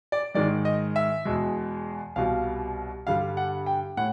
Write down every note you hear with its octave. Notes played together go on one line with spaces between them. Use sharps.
D5
G#2 D#3 G#3 D5
D#5
E5
E2 B2 G#3
C2 B2 G3 F5
G2 D3 G3 F5
F#5
G5
A2 F#5